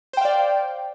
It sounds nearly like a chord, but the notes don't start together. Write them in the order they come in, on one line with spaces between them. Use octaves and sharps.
C5 G5 F5 D5